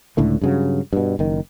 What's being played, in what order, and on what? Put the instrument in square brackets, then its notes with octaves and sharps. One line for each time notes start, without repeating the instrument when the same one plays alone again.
[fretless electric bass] C#2 A2 D3 A3
G2 C#3 F#3
G2 B2
F#1 D#3